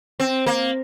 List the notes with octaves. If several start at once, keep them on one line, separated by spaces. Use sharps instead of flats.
C4
A#3